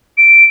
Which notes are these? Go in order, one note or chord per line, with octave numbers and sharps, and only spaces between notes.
D7